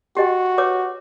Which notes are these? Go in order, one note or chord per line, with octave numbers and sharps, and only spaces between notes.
F#4 G4 D#5 G5
B4 C#5 D6